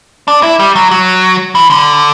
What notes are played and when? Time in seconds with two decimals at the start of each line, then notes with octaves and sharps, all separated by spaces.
0.28 D4
0.43 E4
0.60 G3
0.76 F#3
0.91 F#3
1.55 E3
1.70 D3